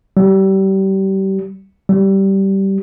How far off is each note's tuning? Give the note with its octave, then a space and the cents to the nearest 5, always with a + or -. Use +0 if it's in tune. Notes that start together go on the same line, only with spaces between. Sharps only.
G3 -30
G3 -15